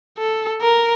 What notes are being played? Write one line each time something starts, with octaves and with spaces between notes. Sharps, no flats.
A4
A#4